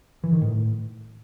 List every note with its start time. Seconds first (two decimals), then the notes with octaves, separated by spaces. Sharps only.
0.24 E3
0.33 D#3
0.42 A2